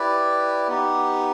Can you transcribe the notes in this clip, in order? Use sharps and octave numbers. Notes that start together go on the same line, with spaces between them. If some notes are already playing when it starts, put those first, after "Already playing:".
Already playing: E4 G4 B4 D5
B3 D#4 G4